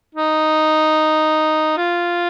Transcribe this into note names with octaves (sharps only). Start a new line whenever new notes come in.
D#4
F4